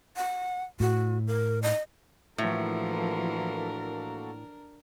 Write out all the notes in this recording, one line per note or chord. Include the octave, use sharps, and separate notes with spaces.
F#5
A2 F#4
A#4
D#5
A2 E3 F3 A#3 D4 F#4 A4 A#4